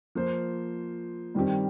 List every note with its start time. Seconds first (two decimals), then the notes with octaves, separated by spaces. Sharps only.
0.15 F3 A#3 F4 C5
1.35 G2 D#3 G3 C4 G4